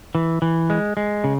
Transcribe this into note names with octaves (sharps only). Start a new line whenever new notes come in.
E3
E3
G#3
G#3
C#3